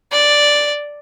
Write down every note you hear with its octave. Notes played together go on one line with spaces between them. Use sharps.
D5